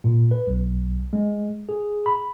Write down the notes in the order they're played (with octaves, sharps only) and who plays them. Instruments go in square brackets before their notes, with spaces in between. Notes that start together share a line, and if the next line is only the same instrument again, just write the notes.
[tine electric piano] A#2
B4
B1
G#3
G#4
B5